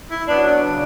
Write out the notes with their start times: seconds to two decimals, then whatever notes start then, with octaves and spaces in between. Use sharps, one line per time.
0.11 E4
0.28 F#3 B3 D4
0.46 D4
0.64 C#3